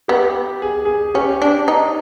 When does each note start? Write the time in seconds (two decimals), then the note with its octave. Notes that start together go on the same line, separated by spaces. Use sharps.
0.08 B3 G4
0.62 G#4
0.85 G#4
1.14 C#4 G4
1.42 D4
1.68 D#4